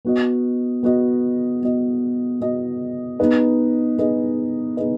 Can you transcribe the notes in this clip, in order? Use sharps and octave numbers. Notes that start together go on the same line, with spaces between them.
B3 F#4 D#5
B3 F#4 D#5
B3 F#4 D#5
B3 F#4 D#5
B3 D#4 G#4 B4 D#5
B3 D#4 G#4 B4 D#5
B3 D#4 G#4 B4 D#5